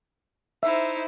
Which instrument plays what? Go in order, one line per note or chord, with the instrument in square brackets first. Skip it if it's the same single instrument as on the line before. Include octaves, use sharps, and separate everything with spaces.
[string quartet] D#4 E4 C5 [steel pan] E5